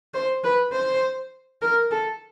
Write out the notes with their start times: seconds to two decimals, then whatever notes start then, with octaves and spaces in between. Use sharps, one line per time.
0.14 C5
0.44 B4
0.72 C5
1.62 A#4
1.91 A4